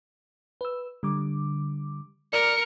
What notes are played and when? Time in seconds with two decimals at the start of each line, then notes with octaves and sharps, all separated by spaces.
0.61 B4 E6
1.03 D3 G3 D6
2.33 A#4 D5 C#7